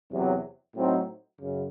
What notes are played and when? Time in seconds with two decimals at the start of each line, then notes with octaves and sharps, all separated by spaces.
0.11 E2 C3 F#3
0.75 A2 F#3 C4 D#4
1.40 F#2 C#3